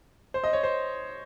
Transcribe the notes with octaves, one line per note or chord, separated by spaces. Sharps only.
C5
D#5
C#5
C5